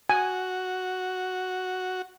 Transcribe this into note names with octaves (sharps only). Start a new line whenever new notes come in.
F#4 G#5